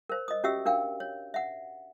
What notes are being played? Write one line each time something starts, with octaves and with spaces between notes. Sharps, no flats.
A#4 C5
D#5 D#6
C#4 F#4 G4 E5 E6
D4 A#4 F5 G5
C#5
E5 F#5